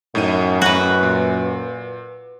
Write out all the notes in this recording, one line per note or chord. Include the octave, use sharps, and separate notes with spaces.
F#2 A2 D#4 D#7
F#4 B4
A#2